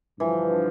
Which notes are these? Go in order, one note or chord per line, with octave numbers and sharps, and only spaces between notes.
G2 D3 E3 F3